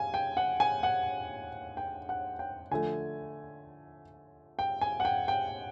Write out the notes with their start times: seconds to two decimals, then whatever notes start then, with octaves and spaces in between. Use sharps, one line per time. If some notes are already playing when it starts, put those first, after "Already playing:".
Already playing: F5 G#5
0.14 G5
0.37 F#5
0.60 G#5
0.83 F#5
1.77 G5
2.09 F#5
2.39 G5
2.71 D3 F3 A3 G#5
4.59 G5
4.81 G#5
5.00 F#5
5.05 G5
5.28 G5